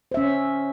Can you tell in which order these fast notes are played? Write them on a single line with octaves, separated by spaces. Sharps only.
C5 E5 C#4